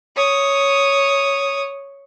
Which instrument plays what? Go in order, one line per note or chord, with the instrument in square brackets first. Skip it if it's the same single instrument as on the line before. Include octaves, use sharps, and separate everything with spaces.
[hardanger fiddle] C#5 D#6